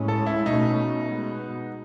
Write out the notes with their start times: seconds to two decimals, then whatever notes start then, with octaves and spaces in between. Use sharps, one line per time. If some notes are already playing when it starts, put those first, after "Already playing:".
Already playing: A2 G#3 C#4
0.08 A4
0.26 E4
0.46 B2 A3 C#4 D#4
1.04 B2 G#3 B3